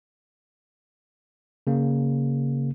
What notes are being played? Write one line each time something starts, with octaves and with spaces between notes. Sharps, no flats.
C#3 A#3